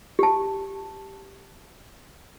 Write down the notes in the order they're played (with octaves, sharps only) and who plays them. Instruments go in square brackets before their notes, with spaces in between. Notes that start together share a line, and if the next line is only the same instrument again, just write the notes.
[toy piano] G4 A5